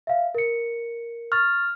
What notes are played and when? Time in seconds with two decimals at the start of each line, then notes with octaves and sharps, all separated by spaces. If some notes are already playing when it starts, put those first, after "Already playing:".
0.07 E5 F5
0.35 A#4 C#7
1.32 C#6 F6 A6